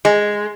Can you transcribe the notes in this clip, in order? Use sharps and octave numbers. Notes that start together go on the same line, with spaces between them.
G#3